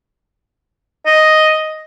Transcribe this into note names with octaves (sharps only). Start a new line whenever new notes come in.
D#5